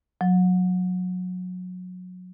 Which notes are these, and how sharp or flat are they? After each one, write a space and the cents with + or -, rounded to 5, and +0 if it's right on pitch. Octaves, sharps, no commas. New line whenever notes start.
F#3 -25